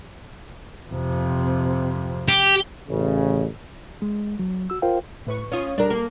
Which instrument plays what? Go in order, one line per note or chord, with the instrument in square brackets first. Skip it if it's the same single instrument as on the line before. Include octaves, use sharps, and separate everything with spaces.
[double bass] F2 C3
[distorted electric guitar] G4
[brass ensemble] A1 C#3
[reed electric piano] G#3
F#3
F#4 E6
F4 A#4 C5 F5 G5
[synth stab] A2 B4 C#6
[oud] C#4 F4 [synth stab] C#5 F5 D#6
[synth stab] G3 [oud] D4 A#4
[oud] A#3